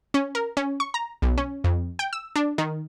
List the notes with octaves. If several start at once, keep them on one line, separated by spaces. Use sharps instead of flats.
C#4
A#4
C#4
C#6
A#5
B1
C#4
F2
G5
E6
D4
D#3